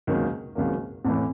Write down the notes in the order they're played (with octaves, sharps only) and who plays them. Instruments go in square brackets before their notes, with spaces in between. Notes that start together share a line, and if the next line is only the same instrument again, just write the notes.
[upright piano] C#2 C3 D#3 F#3 A#3
C#2 C3 D#3 F#3 A#3
[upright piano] A1 A2 E3 [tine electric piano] C4